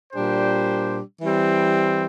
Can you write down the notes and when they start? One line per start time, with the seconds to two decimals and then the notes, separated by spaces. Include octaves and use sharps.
0.13 A#2 G3 D4 G4 C5
1.22 E3 G3 C4